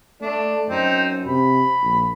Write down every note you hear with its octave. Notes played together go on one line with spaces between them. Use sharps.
A3 D4
F#2 C4 D#4
C3 B5
A#1